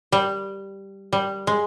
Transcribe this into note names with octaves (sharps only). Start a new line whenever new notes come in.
G3
G3
G#3